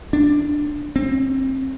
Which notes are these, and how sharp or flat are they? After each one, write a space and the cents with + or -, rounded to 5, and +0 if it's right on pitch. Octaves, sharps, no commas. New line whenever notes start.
D4 +5
C4 +25